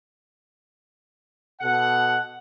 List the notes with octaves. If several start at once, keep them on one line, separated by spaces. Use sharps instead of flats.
B2 A4 F#5